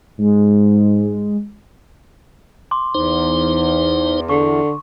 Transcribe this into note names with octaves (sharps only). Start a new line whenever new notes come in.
G#2 G#3
C6 D6
E2 D#4 C5
D3 C#6